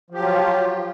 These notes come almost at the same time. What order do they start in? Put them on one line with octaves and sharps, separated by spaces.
F3 G4 F#3 F4